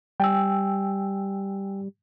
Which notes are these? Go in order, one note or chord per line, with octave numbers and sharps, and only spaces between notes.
G3 G5 G#5 E6